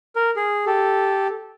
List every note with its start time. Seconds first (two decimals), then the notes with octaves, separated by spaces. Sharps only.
0.16 A#4
0.36 G#4
0.66 G4 A4